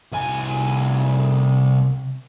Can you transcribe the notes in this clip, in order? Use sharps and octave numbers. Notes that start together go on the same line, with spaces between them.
C2 G#5